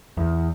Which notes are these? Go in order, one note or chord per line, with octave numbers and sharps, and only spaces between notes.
E2